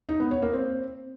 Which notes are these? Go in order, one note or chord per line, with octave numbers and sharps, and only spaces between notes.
D#4
B3
C#5
A#3
C4